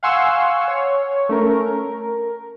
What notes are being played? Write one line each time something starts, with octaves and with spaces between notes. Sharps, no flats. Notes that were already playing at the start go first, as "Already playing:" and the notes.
F5 F#5 G#5 C6 C#6 E6
C#5
A3 C#4 A#4
A#4